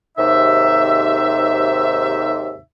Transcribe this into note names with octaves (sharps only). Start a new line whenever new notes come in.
D#2 G#2 C3 D#4 E5